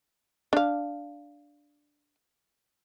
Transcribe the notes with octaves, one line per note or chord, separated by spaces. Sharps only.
D4 F5